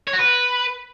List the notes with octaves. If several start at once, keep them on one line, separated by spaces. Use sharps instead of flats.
C#5
F#4
B4